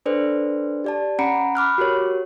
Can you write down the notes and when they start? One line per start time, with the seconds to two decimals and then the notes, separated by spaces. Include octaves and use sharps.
0.06 D4 A4 B4 C5 D5
0.84 G4 D5 A5
1.19 C#4 F#5 A#5 B5 C#7 D7
1.55 B5 D6 F6 F#6
1.78 F#4 G4 A#4 C#5